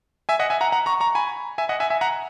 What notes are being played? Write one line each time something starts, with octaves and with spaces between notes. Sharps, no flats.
E5 G#5
D#5 F#5
E5 G#5
F#5 A#5
F#5 A#5
A#5 C#6
A#5 C#6
G#5 B5
E5 G#5
D#5 F#5
E5 G#5
E5 G#5
F#5 A#5